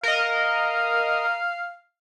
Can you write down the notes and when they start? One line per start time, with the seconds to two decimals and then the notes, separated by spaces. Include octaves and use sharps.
0.03 A#4 D#5 F5